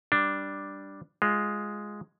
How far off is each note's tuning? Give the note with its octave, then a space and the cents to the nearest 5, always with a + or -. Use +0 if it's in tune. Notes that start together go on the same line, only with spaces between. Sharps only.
G3 +0 D4 +0
G#3 +0 F4 +0